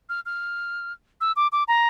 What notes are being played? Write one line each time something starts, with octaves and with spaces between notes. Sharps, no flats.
F6
F6
E6
D6
D6
A#5